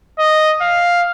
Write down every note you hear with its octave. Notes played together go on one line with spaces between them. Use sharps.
D#5
F5